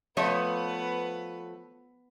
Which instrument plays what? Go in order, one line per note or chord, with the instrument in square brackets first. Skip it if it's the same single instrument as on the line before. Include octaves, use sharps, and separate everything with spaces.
[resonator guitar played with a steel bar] F3 A3 C#5 [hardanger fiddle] B3 B4